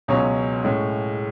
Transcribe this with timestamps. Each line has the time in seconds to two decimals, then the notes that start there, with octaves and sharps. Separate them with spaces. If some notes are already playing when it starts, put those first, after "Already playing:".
0.08 C#2 B2 F#3 C#4
0.64 A2 G#3 C#4